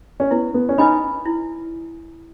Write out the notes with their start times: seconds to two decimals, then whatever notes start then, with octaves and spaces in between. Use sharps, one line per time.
0.20 C#4
0.31 B3 E4
0.54 B3
0.69 C#4
0.78 D#4 B4 D#5 G#5 B5
1.25 E4